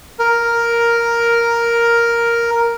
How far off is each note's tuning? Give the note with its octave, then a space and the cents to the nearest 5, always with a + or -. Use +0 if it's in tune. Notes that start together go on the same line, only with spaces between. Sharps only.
A#4 +5